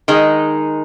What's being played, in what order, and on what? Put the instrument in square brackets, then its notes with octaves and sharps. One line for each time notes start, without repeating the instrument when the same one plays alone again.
[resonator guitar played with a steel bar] D#3 G#3 D#4